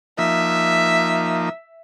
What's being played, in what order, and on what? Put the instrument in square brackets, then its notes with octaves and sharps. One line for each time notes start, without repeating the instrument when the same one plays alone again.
[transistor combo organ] F3 A#3 D#4 [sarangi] E5